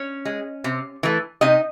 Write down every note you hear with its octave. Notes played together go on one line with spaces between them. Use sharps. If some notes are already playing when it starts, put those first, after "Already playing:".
Already playing: C#4 C#5
G#3
C3
E3 A3
C3 D#4 D#5